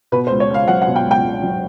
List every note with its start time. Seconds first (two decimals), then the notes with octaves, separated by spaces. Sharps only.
0.12 B2 B4
0.27 C5
0.31 C#2
0.40 C#5
0.50 C#2 F5
0.68 F#3 F#5
0.82 F#5
0.87 B2
0.96 G5
1.06 C#2
1.11 G5
1.24 C#2
1.43 F#3